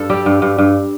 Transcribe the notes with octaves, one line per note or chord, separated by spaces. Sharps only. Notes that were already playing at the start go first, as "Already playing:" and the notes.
Already playing: G2 A4
G3 G4
G2
G2
G2